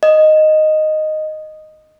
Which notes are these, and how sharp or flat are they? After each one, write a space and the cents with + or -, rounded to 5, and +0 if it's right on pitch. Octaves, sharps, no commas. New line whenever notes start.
D#5 -5